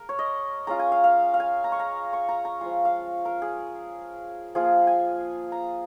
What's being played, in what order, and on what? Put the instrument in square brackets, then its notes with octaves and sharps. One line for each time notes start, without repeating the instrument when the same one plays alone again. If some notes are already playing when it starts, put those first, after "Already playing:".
Already playing: [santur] G#3 A#4
C#5
D#5
G#3 C#4 F4 A#5
G#5
F5
F5
F5
G#5
A#5
C#6
A#5
C#6
A#5
A#5
F3 G#3 F4 G#5
F5
A#4
G#4
F3 A#3 F4 G#4
G#5
A#5